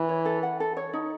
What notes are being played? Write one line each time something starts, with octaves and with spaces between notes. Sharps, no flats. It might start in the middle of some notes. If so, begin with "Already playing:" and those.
Already playing: E3
C#5
A4
F#5
A4
C#5
D#4